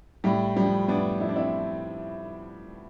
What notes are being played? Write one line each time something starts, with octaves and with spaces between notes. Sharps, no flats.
A2 G3
F3 G3
A2 B3 D4
F3 E4
D4
C4 E4